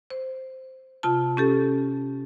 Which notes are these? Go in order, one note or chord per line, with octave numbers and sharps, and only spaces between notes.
C5
C3 F4 A5
C#4 G4 A4